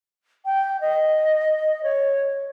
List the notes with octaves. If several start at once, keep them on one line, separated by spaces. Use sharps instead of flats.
G5
D#5
C#5